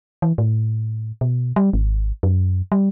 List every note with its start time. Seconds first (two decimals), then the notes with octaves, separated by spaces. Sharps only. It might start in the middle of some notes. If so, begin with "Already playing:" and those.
0.22 E3
0.38 A2
1.21 B2
1.56 G3
1.73 G#1
2.23 F#2
2.72 G3